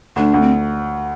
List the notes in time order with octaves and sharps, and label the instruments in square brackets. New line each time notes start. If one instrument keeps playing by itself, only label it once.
[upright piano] D2 [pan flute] D4
[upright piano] D2
[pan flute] C4